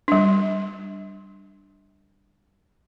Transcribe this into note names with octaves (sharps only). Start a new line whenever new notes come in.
G3 D4